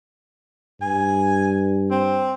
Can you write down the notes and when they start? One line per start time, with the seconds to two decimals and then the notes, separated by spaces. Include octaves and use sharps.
0.81 G2 G#5
1.91 C4